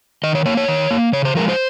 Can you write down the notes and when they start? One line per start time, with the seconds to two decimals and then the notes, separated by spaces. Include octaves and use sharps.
0.24 D#3 D#5
0.35 C#5
0.46 A#3 C#5
0.57 C#5
0.68 D#3
0.91 A#3
1.12 C#3 C#5
1.25 C5
1.35 F3 G#3 A#4
1.49 C5